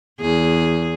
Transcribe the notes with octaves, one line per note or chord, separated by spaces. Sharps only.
E2 G#4